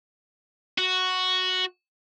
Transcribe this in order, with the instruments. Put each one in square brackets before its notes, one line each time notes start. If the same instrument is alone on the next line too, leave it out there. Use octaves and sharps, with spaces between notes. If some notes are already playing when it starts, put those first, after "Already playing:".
[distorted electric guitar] F#4